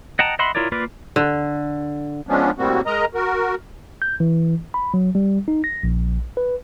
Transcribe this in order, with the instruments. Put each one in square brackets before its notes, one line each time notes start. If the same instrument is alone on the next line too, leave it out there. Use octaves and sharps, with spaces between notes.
[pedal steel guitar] D#5 F#5 G5 A5 A#5
D#5 E5 F#5 B5 C6
E4 F4 A#4 C#5 D5
A#3 F4 A#4 B4 D5
[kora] D3
[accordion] F3 G#3 B3 C#4 D4
A2 G3 A#3 C4 F#4
G#3 A#4 D#5 A#5
F#4 A#4
[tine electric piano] G6
E3
B5
F#3
G3
D#4
A#6
A#1
B4